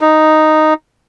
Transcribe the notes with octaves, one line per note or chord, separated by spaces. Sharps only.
D#4